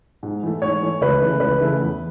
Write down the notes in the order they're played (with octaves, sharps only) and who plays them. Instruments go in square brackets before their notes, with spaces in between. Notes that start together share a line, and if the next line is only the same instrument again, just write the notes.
[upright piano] G#2
E3 A3
[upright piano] G#2 [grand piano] C#5
[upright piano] E3 A3
[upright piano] C#2 [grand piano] B4
[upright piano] C#3 E3 A3 E4
[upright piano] C#2 [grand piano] B4
[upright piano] C#3 E3 A3 E4
E2